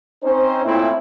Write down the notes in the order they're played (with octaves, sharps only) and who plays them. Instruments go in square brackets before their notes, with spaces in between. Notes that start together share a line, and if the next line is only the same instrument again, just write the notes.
[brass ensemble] C4 C#4 D#4 C5
A#2 A3 C4 C#4 E4